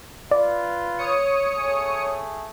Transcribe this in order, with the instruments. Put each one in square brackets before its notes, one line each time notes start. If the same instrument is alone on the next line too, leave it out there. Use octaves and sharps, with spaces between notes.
[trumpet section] F4 B4 [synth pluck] D5
[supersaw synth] C#5 D#6 C#7
[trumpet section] A3 G#4